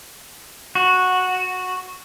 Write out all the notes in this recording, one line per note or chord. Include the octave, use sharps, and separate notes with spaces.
F#4